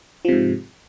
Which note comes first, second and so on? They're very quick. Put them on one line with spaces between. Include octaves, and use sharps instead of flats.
F3 C3 G#2